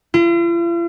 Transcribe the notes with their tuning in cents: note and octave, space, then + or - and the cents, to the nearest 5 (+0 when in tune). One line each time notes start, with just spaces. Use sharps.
F4 -45